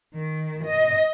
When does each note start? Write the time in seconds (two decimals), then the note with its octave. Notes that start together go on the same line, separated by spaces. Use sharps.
0.13 D#3
0.64 D#5